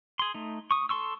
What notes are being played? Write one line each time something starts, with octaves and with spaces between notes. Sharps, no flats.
G#4 C6
A3 D#4
C#6 D#6
A4 A5 C6 C#6 E6